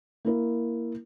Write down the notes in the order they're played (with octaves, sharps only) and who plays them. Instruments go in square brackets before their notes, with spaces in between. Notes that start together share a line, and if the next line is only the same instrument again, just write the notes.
[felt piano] A#3 E4 A#4